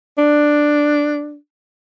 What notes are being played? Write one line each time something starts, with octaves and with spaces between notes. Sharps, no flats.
D4